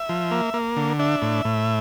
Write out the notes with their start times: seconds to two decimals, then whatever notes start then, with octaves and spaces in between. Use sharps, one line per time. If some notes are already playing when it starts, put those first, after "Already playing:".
Already playing: E5
0.09 F3
0.31 A#3
0.54 A#3
0.77 D3
0.99 D4 E5
1.22 A2
1.45 A2